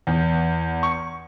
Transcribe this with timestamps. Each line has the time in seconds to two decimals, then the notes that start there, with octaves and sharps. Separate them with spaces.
0.07 E2
0.83 C#6